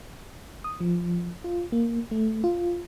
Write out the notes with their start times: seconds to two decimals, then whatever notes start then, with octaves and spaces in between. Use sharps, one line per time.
0.64 D#6
0.80 F3
1.44 F4
1.72 A#3
2.11 A3
2.44 F4